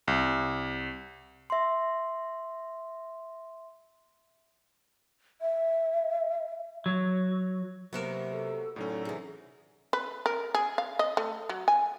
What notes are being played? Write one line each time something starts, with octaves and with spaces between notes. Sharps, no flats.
C2
E5 C6
E5
F#3
C3 F#3 A#3 B3 F#4 A#4 E7
A4
A2 D3 F#3 C#4 D#4 A4
C3 E3 G#4
B4
A#4
G#4
F5
D#5
A3
F#3
G#5